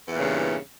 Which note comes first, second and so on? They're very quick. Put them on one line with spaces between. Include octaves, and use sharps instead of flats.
E2 E3 A#2 C#3 G2